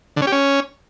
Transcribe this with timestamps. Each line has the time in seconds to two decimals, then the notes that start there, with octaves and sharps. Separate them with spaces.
0.17 D3
0.22 C#4
0.27 G4
0.32 C#4